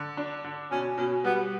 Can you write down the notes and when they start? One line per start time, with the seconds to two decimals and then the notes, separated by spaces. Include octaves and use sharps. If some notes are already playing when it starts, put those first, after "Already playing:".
Already playing: D3
0.17 D4
0.44 D3
0.71 B2 C#4
0.97 B2 C#4
1.24 G3 B3